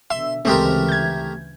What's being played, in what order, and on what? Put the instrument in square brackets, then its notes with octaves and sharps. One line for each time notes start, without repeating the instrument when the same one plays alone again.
[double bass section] B2 D3 [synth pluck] E5 [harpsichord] C6
[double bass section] D2 C#3 E3 [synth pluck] G#3 C4 [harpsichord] A3 G4 A#4
[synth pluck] G6 G#6